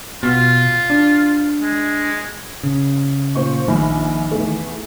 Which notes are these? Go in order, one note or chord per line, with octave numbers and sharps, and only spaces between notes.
B2 F4
D4
G#3
C#3
A#2 C5 C#6
A#1 D#3 B5
E2 A3